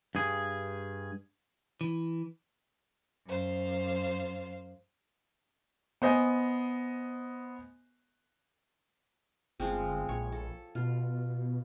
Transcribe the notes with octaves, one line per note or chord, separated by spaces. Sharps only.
G2 G#4
E3
F#2 C5 F5
B3 C5 D#5 G#5
G1 F3 G#3 C4
A#1 C#5
A4
B2 F4